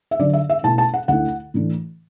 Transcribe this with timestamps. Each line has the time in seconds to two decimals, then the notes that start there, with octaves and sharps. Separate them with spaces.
0.11 E5
0.19 D3 F#3 D4 D5
0.33 E5
0.50 E5
0.63 B2 A3 E4 A5
0.78 A5
0.94 F#5
1.08 D2 D3 A3 E4 F#5
1.54 A2 E3 A3 D4